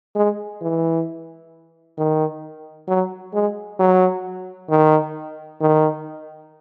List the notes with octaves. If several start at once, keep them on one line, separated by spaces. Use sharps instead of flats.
G#3
E3
D#3
F#3
G#3
F#3
D#3
D#3